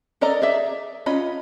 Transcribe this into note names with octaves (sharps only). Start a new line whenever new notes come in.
A4 A#4 D5 D#5 A#5
G#4 D5 E5
C#4 F4 D#5 B5